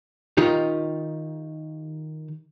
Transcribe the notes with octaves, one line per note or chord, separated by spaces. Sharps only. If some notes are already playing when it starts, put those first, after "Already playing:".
D#3 D#4 F4 G4